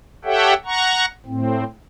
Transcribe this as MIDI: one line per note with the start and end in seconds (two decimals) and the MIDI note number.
0.25 0.54 67
0.25 0.54 69
0.25 0.54 73
0.25 0.54 76
0.25 0.54 78
0.25 0.54 79
0.65 1.05 78
0.65 1.05 82
0.65 1.05 85
1.26 1.64 45
1.26 1.64 60